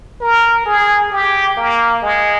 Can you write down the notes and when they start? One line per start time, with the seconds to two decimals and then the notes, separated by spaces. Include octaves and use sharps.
0.21 A#4
0.66 G#4
1.12 G4
1.57 A#3
2.02 G#3